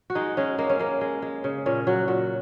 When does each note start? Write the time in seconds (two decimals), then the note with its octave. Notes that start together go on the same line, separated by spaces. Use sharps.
0.10 F#4
0.15 G#3 D#4
0.37 G#3 C#4
0.58 G#3 A#3
0.69 C#4
0.79 G#3 A#3
1.01 G#3
1.22 G#3
1.44 C#3
1.66 A#2 C#4
1.87 F#3 F#4
2.08 A#2 F#4